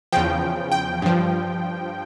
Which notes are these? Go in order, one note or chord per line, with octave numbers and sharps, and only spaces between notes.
E2 C#3 F3 G5
G5
G2 F3